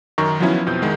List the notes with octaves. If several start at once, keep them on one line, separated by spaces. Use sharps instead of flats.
F#2 D#3 A#5 C#6
F3 F#3 B3 C#4 E4
F2 B2 C4 G6
C2 D#3 G#3